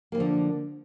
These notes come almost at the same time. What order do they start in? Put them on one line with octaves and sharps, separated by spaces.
A#3 E3 F3 D3